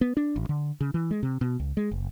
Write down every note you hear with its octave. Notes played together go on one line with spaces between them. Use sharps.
B3
D4
A1
D3
C#3
E3
G#3
C3
B2
C#2
G#3
F#1